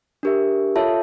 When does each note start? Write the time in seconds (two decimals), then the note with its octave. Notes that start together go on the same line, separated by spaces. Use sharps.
0.23 D4 G4 A#4 E5
0.76 F4 A4 C#5 E5 A5